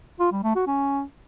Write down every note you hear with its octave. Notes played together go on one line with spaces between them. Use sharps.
F4
G3
A3
F#4
C#4